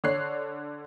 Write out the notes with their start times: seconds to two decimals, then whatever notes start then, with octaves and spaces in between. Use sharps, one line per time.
0.04 D3 C#5 F#6 C7